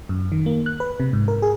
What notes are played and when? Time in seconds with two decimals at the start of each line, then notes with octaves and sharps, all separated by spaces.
0.09 F#2
0.32 D#3
0.46 A#3
0.66 F#6
0.80 B4
1.00 C3
1.13 G#2
1.28 A#4
1.42 G#4